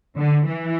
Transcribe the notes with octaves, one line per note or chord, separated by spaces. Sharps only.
D3
E3